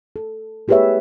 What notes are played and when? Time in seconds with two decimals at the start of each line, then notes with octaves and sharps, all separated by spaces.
0.16 A4
0.68 A3 G4 G#4 B4 C#5 E5